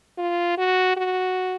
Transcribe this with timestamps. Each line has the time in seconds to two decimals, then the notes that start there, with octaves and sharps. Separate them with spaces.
0.18 F4
0.58 F#4
0.97 F#4